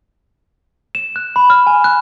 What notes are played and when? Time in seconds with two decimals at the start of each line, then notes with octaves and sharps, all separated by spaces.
0.95 E7
1.16 F#6
1.36 B5
1.50 F6
1.67 G#5
1.84 F#6